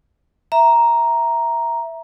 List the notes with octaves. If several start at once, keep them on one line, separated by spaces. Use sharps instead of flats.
E5 A#5